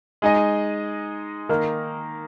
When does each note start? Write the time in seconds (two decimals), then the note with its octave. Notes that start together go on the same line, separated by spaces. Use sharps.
0.22 G#3 D#4 G#4 D#5
1.49 D#3 A#3 D#4 A#4